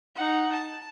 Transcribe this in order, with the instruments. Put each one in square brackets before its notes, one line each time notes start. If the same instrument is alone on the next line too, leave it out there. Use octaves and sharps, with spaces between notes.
[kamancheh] D#4 F#5
A5